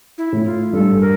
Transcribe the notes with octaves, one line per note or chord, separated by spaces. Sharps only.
E4
A2
F4
G2 A4
A#4